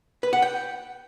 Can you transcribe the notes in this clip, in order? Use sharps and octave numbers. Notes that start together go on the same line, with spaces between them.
B4
F#5
G5